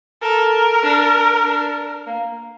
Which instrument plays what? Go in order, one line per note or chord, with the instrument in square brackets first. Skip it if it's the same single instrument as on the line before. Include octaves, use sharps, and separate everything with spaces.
[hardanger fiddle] A4 [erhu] A#4
[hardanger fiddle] D4
D4
A#3